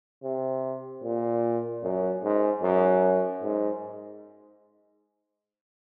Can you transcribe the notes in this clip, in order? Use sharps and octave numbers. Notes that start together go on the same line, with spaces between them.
C3
A#2
F#2
G#2
F#2
G#2